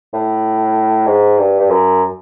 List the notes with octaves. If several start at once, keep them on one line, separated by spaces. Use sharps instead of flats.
A2
G#2
G2
G2
F#2